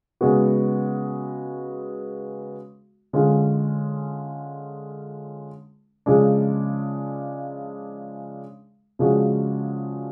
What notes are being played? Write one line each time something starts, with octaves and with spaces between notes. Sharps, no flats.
C#3 G#3 B3 F#4
D3 G#3 C#4 F4
C#3 F3 G#3 D4
C#3 F3 G#3 D4 F#4